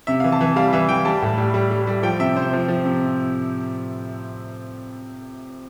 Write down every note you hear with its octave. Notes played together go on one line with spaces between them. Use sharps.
C3 E5
E3 F5
A5
E3
G3 F5
E3 E5
E3 G5
G3 A5
A2
G3
G3
G3
G3
F3 G5
C3 E5
C3 C5
F3
F3
C3